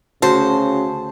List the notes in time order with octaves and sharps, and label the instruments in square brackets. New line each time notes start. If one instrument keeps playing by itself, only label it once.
[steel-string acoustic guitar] D2 C5 A5 [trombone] C#3 [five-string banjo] F#4